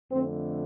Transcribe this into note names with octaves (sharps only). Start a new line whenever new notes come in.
F2 D3 A3 C4